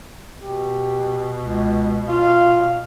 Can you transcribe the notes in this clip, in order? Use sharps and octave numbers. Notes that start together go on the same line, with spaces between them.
B2 G4
C#2
F4 F5